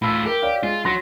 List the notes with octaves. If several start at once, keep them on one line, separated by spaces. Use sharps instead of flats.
A2 F4 B5 E6 B6
G4 A#4
C#5 D5 F5
G#3 F4
F#3 C6 A6 A#6